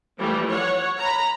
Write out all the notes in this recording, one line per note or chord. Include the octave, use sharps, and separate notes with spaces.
E3 F3 G3 A3
C#5 F#5
A#5 B5